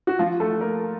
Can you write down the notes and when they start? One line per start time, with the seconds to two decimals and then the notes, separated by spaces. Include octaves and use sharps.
0.07 F#4
0.19 F3 F4
0.40 A3 A4
0.61 A#3 A#4